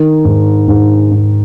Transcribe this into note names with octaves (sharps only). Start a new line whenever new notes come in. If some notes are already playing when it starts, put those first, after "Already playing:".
Already playing: D#3 D#4
G#2
G#2
G#2